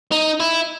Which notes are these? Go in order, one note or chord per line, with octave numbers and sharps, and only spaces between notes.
D#4
E4